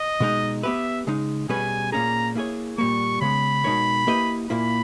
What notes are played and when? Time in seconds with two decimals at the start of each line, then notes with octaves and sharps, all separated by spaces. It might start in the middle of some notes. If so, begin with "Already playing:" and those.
Already playing: D#5
0.20 B2 G#3 D#4
0.63 B3 G4 B4 E5
1.07 C#3 G#3 D#4
1.49 B2 G3 C#4 G#4 B4 G#5
1.92 A#2 A#3 C#4 G#4 A#5
2.35 A#3 E4 G#4 C#5
2.78 A#2 G3 A#3 C#6
3.21 C#3 G#3 B3 B5
3.64 B2 G#3 D#4 A#4 C#5
4.07 A#3 E4 G4 B4 D#5
4.50 A#2 A#3 E4 B5